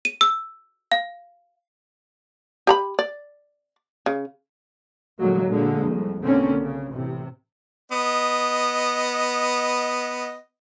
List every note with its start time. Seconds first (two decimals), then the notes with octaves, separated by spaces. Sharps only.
0.05 D#7
0.21 E6
0.92 F5
2.67 G4 A#5 B5
2.99 D5
4.06 C#3
5.18 A#2 D3 F#3 G#3 A#3
5.48 A#2 D3 G#3 A#3
5.83 C2 F2
6.22 B1 D3 A#3 C4 C#4
6.61 C#3
6.91 A1 C3
7.92 B3 D#5